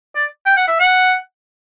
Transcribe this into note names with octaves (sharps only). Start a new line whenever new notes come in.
D5
G5
F#5
E5
F#5